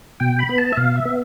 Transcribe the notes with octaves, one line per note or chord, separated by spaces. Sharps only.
B2 G5
B5
B3
A5
E5
B2 F5
E5
B3